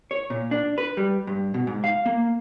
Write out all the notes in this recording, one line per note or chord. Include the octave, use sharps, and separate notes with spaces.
C#5
A#2
D4
B4
G3
G2
B2
G#2
F5
A#3